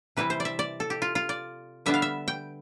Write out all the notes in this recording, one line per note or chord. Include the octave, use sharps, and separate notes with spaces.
C3 E3 G3 C4 E4 B4
C5
D5
E5
D5
A4
G4
F4
F4
D5
D3 G3 B3 D4 E5
F5
E5
G5